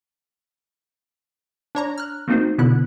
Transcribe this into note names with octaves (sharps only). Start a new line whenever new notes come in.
D4 C#5 A#5
F6 F#6
A3 A#3 C4 D#4 F#4 C5
B2 D3 B3 E4 F#6